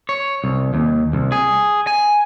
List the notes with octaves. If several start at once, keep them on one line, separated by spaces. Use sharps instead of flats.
C#5
C2
D#2
C2
G#4
G#5